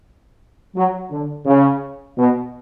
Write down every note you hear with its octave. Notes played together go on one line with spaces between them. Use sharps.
F#3
D3
C#3
B2